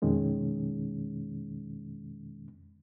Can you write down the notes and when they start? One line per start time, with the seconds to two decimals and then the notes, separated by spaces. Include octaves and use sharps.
0.02 F2 B2 D#3 G#3 C#4